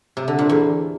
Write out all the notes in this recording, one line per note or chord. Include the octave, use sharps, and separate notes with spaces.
C3
D3
A#2
E2